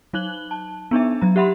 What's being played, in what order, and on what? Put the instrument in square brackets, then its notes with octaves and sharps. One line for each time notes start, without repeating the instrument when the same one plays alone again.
[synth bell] F#3 D#4 F#6 F#7 G7
A5
B3 D4 D#4 E5
F#3 A#5
G4 E5 F#5 B5 C6